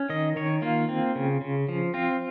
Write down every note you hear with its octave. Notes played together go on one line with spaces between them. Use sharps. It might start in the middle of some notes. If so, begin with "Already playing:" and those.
Already playing: C#4
D#3 D#5
D#3 C#5
A#3 F4
C4
C#3
C#3
F3
C4 F4